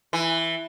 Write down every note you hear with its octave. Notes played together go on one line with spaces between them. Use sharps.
E3